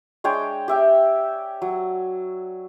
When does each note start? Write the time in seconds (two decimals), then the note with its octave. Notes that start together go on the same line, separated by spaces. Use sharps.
0.24 G#3 D4 C#5 G5
0.68 G4 E5 G5
1.62 F#3